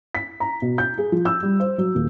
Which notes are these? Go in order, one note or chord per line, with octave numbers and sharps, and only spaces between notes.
B6
A#5
B2
G6
G#4
F3
E6
G3
C5
F#3
D#1